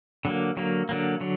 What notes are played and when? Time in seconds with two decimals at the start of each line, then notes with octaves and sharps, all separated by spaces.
0.25 D3 F#3 A#3
0.57 D3 F#3 A#3
0.89 D3 F#3 A#3
1.21 D3 F#3